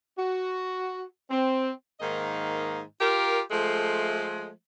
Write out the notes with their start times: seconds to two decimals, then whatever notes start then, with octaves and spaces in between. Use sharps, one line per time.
0.19 F#4
1.31 C4
2.00 G#2 D#3 A#3 D#5
3.00 F4 G4 A#4
3.51 F3 G#3 A3